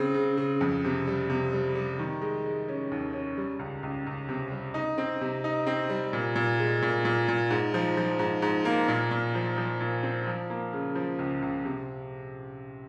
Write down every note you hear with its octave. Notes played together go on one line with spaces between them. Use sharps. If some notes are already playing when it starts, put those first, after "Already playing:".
Already playing: C#3 C4
C#3
C#3
F2
C3
G3
C3
G3
G3
D#3
G#3
G#3
C#4
D#2
C#4
G3
C#2
C#2
C#2
C3
G3
D#4
C4
C3
D#4
C4
G3
A#2
A#2
G#3
A#2
A#2
A#2
G#2
F3
F3
G#2
G#2
A#3
A#2
A#2
F3
F3
A#2
C4
F3
A#3
C#3
F3
C#2
C#2
C3